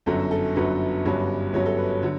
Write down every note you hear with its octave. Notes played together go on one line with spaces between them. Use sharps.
G1 F#2 D3 F#3 A4
A4
G1 F#2 D3 F#3 B4
G1 G2 F#3 C#4
G1 G2 F#3 C#4 C#5
A4
B4
C#5
D3 F#3 C#5